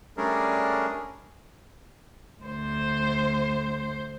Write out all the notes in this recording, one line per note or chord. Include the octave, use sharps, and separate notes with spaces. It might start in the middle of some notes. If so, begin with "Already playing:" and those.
G3 A3 C#4 D4 G#4 A#4
D2 C5